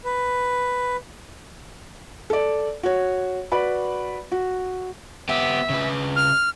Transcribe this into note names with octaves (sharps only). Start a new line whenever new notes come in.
B4
A4 D5
F#4 C#5
F#4 B4 D5 B5
F#4
B3 G4 E5
C#3 B4
F6